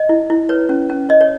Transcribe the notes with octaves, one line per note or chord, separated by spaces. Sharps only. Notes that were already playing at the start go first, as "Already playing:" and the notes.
Already playing: D#5
E4
E4
B4 C#5
C#4
C#4
C#5 D#5
C#5